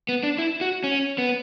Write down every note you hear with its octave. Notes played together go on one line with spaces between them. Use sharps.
B3
D4
E4
F#4
C#4
B3